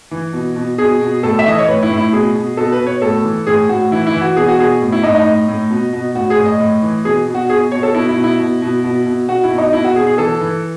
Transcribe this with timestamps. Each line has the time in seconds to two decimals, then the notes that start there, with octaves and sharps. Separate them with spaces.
0.11 E3
0.33 B2
0.56 B2
0.78 B2 G#4
1.01 B2
1.23 A2 A4
1.39 E5
1.46 E3 D#5
1.59 C#5
1.67 A2 B4
1.83 E4
1.90 A2
1.97 E4
2.12 B2 G#4
2.35 B2
2.57 B2 A4
2.72 B4
2.80 B2
2.87 C#5
3.02 A2 A4
3.24 E3
3.46 A2 G#4
3.69 A2 F#4
3.91 E3 E4
4.07 E4
4.14 E3
4.21 F#4
4.36 B2 G#4
4.48 F#4
4.58 B2 G#4
4.81 A2
4.92 E4
5.03 A2 D#4
5.15 D#4
5.26 A2
5.48 A2
5.70 B2
5.93 B2
6.15 A2 F#4
6.30 G#4
6.37 A2
6.46 D#5
6.60 A2
6.82 E3
7.05 B2 G#4
7.27 B2
7.35 F#4
7.49 B2 G#4
7.72 B2 C#5
7.83 A4
7.94 B2 E4
8.09 E4
8.17 B2
8.24 E4
8.39 B2
8.62 B2
8.84 B2
9.06 B2
9.28 B2 F#4
9.44 E4
9.51 B2
9.58 D#4
9.73 B2 E4
9.85 F#4
9.95 B2 G#4
10.07 G#4
10.18 E3 A4
10.41 E3